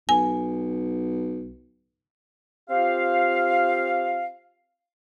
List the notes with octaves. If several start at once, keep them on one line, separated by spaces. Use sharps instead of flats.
B1 G#5
C4 F4 G4 F5